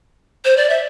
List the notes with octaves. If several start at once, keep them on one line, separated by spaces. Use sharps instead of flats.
C5
D5
E5